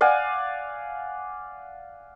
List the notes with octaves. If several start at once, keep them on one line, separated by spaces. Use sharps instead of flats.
D5 F5 F#5 G#5